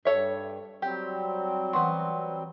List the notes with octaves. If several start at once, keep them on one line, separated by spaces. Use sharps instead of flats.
G2 A4 C#5 E5
F#3 G3 C4 G4
E3 B3 F#4 C6